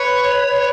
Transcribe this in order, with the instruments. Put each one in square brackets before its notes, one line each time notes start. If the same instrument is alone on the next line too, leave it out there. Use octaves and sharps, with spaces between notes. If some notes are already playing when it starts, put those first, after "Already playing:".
Already playing: [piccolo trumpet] B4 [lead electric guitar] C#5
[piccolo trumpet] B4